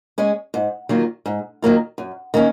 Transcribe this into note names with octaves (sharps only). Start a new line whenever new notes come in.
G#3 C#4
G#2
D#3 F#3 A#3 F4
G#2
D#3 F#3 A#3 F4
F#2
D#3 A#3 C#4